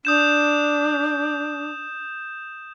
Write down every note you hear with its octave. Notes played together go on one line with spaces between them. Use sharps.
D4 D#6 G6 E7